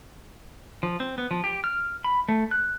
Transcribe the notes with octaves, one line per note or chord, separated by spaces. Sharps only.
F3
C4
B3
F3
G4
F6
B5
A3
F#6